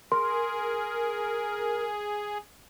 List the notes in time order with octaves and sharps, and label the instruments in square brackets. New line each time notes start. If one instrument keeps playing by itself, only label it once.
[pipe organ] G#4 [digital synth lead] A#4 [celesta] C6